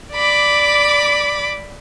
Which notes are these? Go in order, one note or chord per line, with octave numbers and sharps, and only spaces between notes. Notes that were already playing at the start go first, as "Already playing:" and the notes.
D5 B5 D6